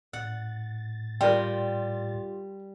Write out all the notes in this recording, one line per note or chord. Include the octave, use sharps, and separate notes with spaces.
A2 F#5 A6
G3 F4 G4 A#4 G5 C6